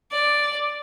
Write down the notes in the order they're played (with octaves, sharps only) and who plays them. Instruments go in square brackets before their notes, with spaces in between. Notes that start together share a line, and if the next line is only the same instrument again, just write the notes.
[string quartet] D5